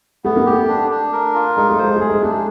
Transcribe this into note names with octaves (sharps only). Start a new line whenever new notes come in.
A3 B3
A#3
A3 G4
D4
D4
A#4
F4
G#3 D#4
A3
C5
G#3
A3 G#4
G#3
A3 D4